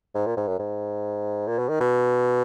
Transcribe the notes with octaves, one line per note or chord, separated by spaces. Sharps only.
G#2
A#2
G#2
F#2
G#2
A#2
B2
D#3
B2